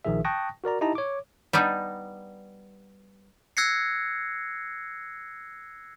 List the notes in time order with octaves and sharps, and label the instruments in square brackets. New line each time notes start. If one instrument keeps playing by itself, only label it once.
[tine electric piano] A#1 D#3 F3 G#4 E5
G5 A5 C#6 D#6 F#6 A#6
F#4 A#4 D5 A#5
D#4 E4 G4 D#5 A5 A#5
C#5 D6
[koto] G3 B3 D4 D#4
[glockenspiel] E6 F#6 G#6 A#6 C7 C#7